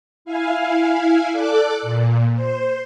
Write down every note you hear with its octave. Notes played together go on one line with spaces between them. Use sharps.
E4 F5 G#5
A4 D5 D6 F#6
A#2
C5